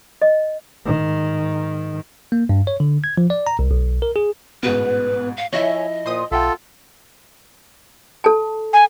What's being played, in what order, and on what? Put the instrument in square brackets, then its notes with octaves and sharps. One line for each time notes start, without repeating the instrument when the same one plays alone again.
[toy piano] D#5
[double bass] G#2 D#3
[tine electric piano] A#3
G2
C#5
D3
G#6
F3
D5
A#5
C2
B1
A#4
G#4
[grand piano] A1 G#2 B2 [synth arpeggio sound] B3 [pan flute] B4
[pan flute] F5
[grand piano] F3 E4 [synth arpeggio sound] C#5 E5 G#5 [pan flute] D#5
[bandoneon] A#2 [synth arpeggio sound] C5 C6 D#6
[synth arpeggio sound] B1 [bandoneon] F4 A4 [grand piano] E5 F#5 G5
[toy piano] A4 A5
[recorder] G#5